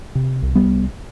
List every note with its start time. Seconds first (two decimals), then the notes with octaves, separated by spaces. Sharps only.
0.15 C3
0.42 C2
0.55 G3 B3